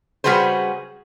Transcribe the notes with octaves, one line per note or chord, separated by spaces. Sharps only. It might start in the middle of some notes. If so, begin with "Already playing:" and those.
C#3 G3 F#4 G#4 B4 C5